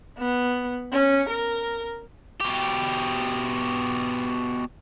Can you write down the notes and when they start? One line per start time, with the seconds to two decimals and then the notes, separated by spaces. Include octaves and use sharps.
0.18 B3
0.92 C#4
1.30 A#4
2.40 B2 G4